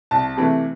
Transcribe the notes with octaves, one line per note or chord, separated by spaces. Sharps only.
C2 A5
C3 E3 A3